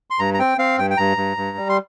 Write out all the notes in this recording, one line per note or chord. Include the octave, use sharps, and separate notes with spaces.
C6
G2 A#5
A#5
C4 G5
C4 F5
G2 G5
G5
G2 A#5
G2
G2
G3
C6